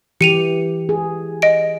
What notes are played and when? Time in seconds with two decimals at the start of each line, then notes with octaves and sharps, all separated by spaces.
0.21 E3 G4 C#7 D#7 F7
0.89 G#4
1.42 D#5 D7